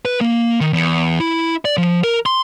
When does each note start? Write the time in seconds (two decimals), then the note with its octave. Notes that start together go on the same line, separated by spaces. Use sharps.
0.05 B4
0.21 A#3
0.61 D#3
0.73 E2
1.20 E4
1.65 D5
1.77 F3
2.04 A#4
2.26 C6